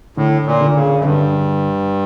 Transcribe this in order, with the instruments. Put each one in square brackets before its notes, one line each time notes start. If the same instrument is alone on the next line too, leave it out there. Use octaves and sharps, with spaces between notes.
[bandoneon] A2 [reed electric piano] D3
[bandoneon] A#2
[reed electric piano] D3
[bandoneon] C#3
F#2
[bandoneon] G2 [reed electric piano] D3